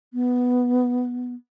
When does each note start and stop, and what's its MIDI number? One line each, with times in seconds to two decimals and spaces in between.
0.14 1.34 59